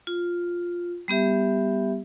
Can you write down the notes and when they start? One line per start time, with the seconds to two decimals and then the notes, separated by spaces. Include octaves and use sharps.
0.07 F4
1.08 G3 B3 G4 E5